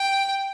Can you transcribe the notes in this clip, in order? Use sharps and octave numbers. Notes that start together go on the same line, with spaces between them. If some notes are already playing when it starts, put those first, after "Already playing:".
Already playing: G5